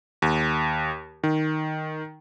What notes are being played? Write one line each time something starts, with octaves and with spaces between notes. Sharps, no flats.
D#2
D#3